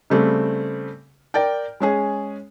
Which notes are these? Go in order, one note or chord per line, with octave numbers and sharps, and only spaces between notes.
C#3 G3 A3 C4
A#4 D5 G5
G#3 C#4 G#4